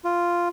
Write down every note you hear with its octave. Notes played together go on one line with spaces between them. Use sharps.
F4